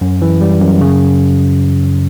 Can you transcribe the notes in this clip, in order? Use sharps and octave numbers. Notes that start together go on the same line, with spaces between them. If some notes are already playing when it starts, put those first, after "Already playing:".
F#2
E3
G3
F#2
C#3